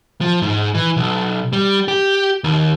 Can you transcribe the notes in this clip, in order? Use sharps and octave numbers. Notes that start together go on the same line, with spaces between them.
F3
G#2
E3
B1
G3
G4
D#2